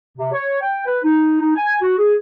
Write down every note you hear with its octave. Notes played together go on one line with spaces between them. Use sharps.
C3
C#5
G5
B4
D#4
D#4
G#5
F#4
G#4